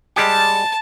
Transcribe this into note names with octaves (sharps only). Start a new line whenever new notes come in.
G3 G#3 G4 A5